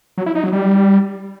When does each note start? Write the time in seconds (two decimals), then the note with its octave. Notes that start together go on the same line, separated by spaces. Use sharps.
0.18 F#3
0.26 E4
0.35 D#4
0.44 F#3
0.52 G3